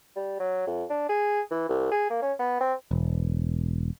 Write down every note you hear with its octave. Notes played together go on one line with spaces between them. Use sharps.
G3
F#3
F2
D4
G#4
E3
C2
G#4
A#3
C#4
B3
C4
E1